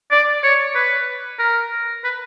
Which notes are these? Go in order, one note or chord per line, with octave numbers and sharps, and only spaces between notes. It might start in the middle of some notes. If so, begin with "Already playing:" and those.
D5
C#5
B4
A#4
B4